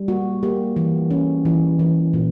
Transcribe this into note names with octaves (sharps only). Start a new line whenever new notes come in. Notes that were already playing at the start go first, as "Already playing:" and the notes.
Already playing: G3
A#3 F#4
A#3 G4
E3
C#4
E3
E3
A#2